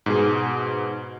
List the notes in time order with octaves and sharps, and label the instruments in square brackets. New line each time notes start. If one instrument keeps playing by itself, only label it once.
[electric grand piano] G#2 B2 G#4